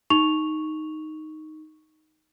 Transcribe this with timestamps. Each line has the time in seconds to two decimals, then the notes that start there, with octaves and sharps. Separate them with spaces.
0.10 D#4 C#6 F7